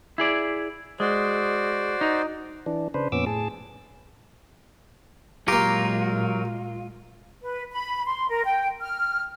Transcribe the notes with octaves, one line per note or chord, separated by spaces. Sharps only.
E4 G#4 D5
G#3 F#4 C5 D5
D#4
E3 D4
C#3 D4 B4 C5
F2 A#2 B3 C#4 D6 E6
A2 G#4 A5
A#2 F#3 G#3 A#3 F4 G4 A#4
B4
B5
C6
A#4
G5
F6